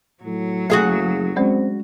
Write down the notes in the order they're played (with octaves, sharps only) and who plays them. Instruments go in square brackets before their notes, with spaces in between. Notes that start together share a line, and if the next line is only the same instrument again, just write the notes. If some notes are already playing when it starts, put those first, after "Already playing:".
[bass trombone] A2 [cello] F#3
[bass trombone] F#1 [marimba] A3 [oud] F#4 G#4 F5
[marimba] G#3 C#4 D5 [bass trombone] C4